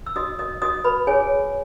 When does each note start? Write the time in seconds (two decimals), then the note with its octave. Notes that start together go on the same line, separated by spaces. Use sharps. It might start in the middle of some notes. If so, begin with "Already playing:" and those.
0.06 E6
0.16 F#4 D#5 D#6
0.39 D#5 D#6
0.62 F#4 D#5 D#6
0.84 B4 B5
1.07 G#4 C#5 G#5